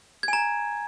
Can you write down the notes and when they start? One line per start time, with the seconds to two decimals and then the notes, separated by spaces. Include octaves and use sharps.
0.23 G#6
0.28 G#5
0.33 A#5